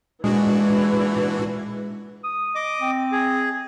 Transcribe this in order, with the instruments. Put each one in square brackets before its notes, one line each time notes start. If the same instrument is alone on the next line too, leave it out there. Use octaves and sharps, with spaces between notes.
[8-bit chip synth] A#2 D4 F#4 [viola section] E3 [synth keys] G#3
[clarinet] D#6
[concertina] D#5 D6
[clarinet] C4
[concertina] G#4